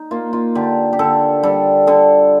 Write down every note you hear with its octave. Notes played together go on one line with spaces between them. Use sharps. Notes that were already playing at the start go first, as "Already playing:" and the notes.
Already playing: D#4
A#3 F4
F4
D3 G4
G4
D3 A4
G3 A4
D3 A4